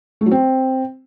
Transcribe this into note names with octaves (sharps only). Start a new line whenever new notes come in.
A3
F#3
C4